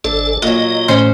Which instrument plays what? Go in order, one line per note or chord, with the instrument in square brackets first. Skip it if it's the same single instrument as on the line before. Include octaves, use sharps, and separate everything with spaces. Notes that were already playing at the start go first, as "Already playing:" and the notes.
[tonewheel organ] G#1 A4 [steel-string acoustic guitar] D4
[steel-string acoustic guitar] A#2 F#3 [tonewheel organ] D#5
[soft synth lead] A2 [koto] C#4 C5